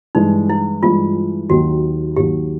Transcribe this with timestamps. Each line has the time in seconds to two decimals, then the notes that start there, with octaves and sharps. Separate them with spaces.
0.15 G2 E3 G#3 D#4
0.50 E4
0.83 G2 E3 G#3 F4
1.50 D#2 D#3 F#3 F#4
2.17 D#2 D#3 F#3 G4